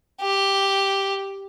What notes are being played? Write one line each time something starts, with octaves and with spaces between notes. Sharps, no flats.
G4